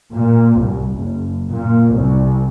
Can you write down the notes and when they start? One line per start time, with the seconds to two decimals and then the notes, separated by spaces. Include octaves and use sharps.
0.13 A#2
0.60 C2
0.94 F#1
1.50 A#2
1.94 C2